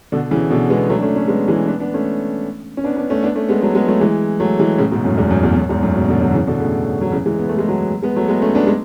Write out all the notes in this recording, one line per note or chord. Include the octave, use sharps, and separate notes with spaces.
B2 D3
C#3 E3
B2 D3
G#3 B3
F#3 A3
D4
A3 C#4
A3 C#4
G#3 B3
E3 G#3
B3 D4
B3 D4
A3 C#4
C#4
B3 D4
B3 D4
A3 C#4
B3 D4
A3 C#4
G#3 B3
F#3 A3
G#3 B3
F#3 A3
E3 G#3
F#3 A3
E3 G#3
A2 C#3
G#2 B2
F#2 A2
E2 G#2
F#2
E2
F#2
E2 G#2
F#2 A2
G#2 B2
B2 D3
D3 F#3
C#3 E3
B2 D3
A2 C#3
F#3
C#3 E3
E3 G#3
B3
A3
G#3
F#3 A3
G#3 B3
F#3 A3
G#3 B3
A3 C#4
B3 D4
G#3 B3